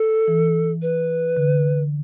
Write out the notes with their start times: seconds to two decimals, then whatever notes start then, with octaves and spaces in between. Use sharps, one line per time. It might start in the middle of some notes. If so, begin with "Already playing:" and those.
Already playing: A4
0.28 E3
0.82 B4
1.37 D3